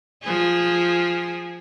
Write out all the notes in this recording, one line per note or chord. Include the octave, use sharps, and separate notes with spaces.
F3 G#4